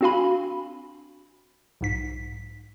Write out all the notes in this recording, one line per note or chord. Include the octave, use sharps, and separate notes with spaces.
C4 D4 F#4 F5 G#5 B5
B1 G#2 B6